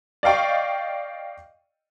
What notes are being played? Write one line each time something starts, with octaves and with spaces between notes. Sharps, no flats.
D5 D#5 F5 G5 C#6